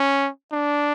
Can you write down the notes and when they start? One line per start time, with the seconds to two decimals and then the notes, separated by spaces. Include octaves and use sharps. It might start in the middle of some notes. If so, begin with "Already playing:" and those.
Already playing: C#4
0.52 D4